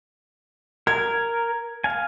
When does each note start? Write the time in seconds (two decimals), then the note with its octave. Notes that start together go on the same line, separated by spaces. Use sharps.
0.87 A#4 G#6
1.84 F5 G#5